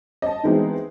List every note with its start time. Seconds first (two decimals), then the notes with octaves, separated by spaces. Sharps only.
0.22 D#5 A5
0.43 E3 G#3 B3 C4 D#4